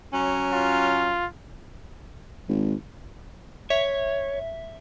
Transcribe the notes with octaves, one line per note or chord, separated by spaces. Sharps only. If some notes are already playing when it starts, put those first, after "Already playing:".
F#3 C#4
F4
G#1
C#5 E5